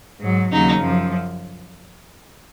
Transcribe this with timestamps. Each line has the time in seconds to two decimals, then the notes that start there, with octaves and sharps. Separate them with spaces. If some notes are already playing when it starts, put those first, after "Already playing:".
0.20 G#2 F#3
0.51 D#2 C#3 F#3 D#4
0.81 F#2 F3